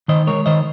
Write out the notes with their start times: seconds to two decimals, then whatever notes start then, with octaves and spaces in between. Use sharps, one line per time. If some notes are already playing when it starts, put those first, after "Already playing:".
0.08 D#3 C5 D#5
0.27 G#3 A#4 C#5
0.46 D#3 C5 D#5